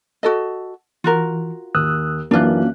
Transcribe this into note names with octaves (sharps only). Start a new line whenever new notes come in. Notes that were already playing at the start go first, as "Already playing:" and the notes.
F#4 A4 D#5
E3 F4 F#4 A#4
D#2 D#6 E6 F#6
F#2 E3 A#3 C#4 D4 F4 F#4 F#6